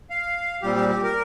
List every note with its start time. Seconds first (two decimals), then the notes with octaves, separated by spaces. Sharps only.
0.10 F5
0.62 A#2 G3 C4 G4
0.75 G4
0.89 G4
1.03 A#4